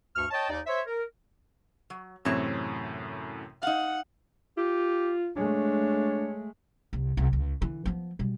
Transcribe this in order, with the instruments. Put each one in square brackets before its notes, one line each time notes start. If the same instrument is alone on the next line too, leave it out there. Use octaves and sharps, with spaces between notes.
[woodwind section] D2 G2 C#6 F6
C#5 D#5 G5 A5
D#2 D#4 D5
C5 C#5 E5
A#4
[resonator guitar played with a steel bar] F#3
[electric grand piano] F#2 A2 C3 [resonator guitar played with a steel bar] E3 C4 C#5
[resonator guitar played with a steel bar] D#4 F5 [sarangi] F#5
[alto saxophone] F4 [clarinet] G4
[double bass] G#3 A3 [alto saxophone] D4 [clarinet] C#5
[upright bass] C2
C2
C#2
D3 E3
F3 B3
B2 G3